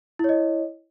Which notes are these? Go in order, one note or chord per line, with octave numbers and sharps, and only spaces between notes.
E4 C#5 D#5